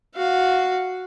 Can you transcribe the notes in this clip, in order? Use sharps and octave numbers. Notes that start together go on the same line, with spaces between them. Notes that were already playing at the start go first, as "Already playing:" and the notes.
F#4 F5